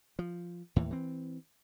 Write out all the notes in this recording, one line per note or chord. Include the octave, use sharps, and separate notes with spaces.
F3
D#2 A2 E3
E3 C4